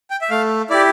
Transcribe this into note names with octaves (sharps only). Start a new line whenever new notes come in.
G5
E5
A3 F5
E4 G4 D5